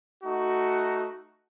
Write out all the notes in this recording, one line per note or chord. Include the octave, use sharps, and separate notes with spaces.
A3 D#4 F#4